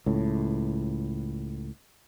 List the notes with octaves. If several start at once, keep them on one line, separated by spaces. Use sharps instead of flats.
C#2 A2